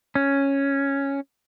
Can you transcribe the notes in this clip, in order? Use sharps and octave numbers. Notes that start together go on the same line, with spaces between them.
C#4